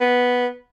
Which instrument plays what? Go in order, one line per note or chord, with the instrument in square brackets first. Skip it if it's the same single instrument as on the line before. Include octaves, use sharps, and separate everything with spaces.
[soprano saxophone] B3